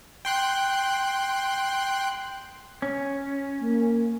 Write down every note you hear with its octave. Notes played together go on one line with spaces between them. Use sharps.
G5 C6 F#6
C#4
A#3